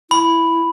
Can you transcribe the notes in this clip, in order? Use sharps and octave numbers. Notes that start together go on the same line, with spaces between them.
E4 B5